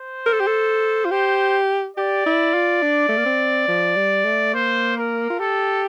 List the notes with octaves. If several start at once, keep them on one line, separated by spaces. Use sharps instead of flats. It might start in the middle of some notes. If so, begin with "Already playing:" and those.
Already playing: C5
A#4
A4
G4
A4
F4
G4 C5
G4 D5
E4
F4
D4
A3
A#3
C4
F3
G3
A3
A#3 C5
A#4
F4
G4 A4